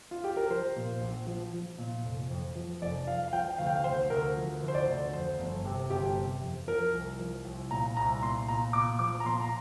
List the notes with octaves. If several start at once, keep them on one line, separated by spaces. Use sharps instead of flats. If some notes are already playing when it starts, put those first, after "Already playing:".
F4
G4
A#4
F3 C5
A#2
A#1
F3
F3
A#2
F1
F2
F3
F1 D5
F3 F5
F5
F3 G5
D2 F5
G5
F5
D2 C5
D2 A#4
F3
D2
C5
D5
D2
F2 C5
G1
C3
G1 G4
C3
F2
F3 A#4
C2
F3
C2
A#2 A#5
C2 A#5
A#2 C6
A#2 A#5
A#2 D6
F3 D6
A#5
A#2 C6
A#5